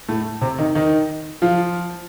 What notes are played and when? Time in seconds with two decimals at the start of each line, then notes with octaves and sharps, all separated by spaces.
0.08 A2 A3
0.41 C3 C4
0.58 D#3 D#4
0.75 D#3 D#4
1.42 F3 F4